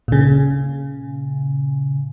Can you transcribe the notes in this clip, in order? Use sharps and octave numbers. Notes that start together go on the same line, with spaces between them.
A#2 C#3